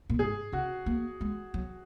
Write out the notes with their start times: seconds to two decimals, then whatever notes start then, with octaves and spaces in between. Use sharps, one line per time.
0.10 A#2
0.19 G#2 G#4
0.52 C#3 F#4
0.86 A#3
1.21 G#3
1.54 F#3